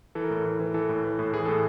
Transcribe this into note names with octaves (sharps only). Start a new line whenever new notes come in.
E3 A4
A#4
A2 A4
E3
E3
E3 A4
A2
E3
A2
E3 G#4
A2 A4